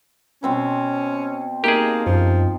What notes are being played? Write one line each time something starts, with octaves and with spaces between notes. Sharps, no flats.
B2 C4 C#4 B4
A#3 D#4 G4 G#4 F5 A5
F#2 F3